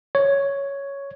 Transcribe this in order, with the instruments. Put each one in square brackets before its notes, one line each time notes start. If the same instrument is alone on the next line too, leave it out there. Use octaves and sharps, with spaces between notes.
[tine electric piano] C#5